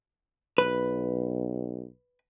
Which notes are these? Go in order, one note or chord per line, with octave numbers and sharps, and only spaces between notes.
B1 B4